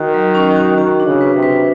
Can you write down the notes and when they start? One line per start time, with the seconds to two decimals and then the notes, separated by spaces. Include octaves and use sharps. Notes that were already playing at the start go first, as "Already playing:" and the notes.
Already playing: D#3 F#4
0.14 F#3
0.35 C#4
0.56 F#4
0.78 D#3 F#4
1.00 D4
1.07 C#3
1.21 B4
1.36 C3
1.43 B4